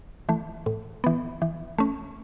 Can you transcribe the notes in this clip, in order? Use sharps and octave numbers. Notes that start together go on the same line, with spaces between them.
E3 A3
A2
E3 B3
E3
A3 C#4